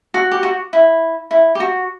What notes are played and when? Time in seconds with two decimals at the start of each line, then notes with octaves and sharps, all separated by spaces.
0.14 F#4
0.31 G4
0.43 F#4
0.73 E4
1.31 E4
1.55 G4
1.60 F#4